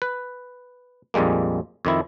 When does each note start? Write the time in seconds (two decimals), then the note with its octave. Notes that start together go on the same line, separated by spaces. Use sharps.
0.02 B4
1.14 A#1 F2 G3 G#3 A#3
1.85 F2 D#3 E4